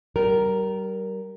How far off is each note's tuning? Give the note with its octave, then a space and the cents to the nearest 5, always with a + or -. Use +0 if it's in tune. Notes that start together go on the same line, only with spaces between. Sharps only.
G3 -35 A#4 +0